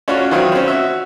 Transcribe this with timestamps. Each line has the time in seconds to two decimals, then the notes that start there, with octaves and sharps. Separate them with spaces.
0.08 C#4 D4 F4 F#4 C#5
0.31 D#3 E3 F#3 C4 E4 F4
0.52 C4 C#4
0.67 F#4 E5